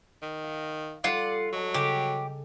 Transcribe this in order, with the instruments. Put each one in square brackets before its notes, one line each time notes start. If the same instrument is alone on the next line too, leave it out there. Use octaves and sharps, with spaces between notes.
[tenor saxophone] D#3
[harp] F5 A#6 C#7
[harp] G3 A4 D#7 [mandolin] F4 F#5 [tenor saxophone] D5
[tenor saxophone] F#3 [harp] A4 D#5 A5
[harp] C#3 [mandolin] G4